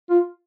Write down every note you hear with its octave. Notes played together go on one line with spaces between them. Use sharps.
F4